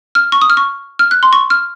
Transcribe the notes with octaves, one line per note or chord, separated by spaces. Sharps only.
F6
C#6
D#6
F6
C#6
F6
F#6
C6
C#6
F6